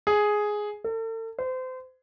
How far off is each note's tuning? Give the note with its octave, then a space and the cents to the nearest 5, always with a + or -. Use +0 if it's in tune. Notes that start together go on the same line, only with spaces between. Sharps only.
G#4 +5
A4 +40
C5 -30